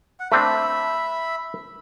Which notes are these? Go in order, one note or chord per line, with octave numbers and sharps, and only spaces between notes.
F#5
A3 C4 D4 E5 B5